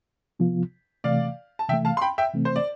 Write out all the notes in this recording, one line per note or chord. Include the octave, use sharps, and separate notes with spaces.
C3 F3 B3 F4
C3 E3 A3 D5 F5
A5
C3 E3 A3 E5 G5
F5 A5
C6
G5 B5
E5 G5
C3 E3 A3 C4
C5
D5